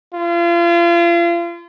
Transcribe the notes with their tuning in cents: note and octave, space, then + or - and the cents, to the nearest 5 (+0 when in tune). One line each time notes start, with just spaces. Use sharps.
F4 -35